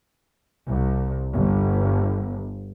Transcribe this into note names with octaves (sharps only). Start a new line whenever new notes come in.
C2
G1